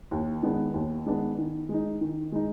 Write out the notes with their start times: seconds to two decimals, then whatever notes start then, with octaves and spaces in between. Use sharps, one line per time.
0.11 D#2
0.43 D#3 G#3 B3 D4
0.74 D#2
1.06 D#3 G#3 B3 D4
1.38 D#3
1.69 G#3
1.74 D#4
2.01 D#3
2.32 G#3 D#4